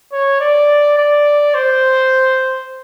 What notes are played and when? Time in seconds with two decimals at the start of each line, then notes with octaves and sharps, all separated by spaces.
0.12 C#5
0.40 D5
0.98 D5
1.55 C5